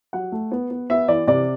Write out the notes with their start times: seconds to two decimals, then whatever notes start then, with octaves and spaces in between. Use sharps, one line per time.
0.13 F#3 F#5
0.32 A3
0.52 B3
0.71 B3
0.90 B3 E5
1.08 E3 D5
1.27 C3 D5